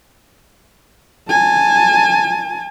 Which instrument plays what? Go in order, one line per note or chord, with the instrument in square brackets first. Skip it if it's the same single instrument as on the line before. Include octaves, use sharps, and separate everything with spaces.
[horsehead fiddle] G#5 A5